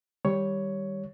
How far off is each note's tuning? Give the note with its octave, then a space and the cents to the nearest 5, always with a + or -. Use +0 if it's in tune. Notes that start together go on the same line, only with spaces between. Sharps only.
D#3 +0 G3 +0 C#5 +10